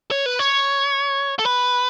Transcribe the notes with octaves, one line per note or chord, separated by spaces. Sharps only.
C#5
B4
C#5
A4
B4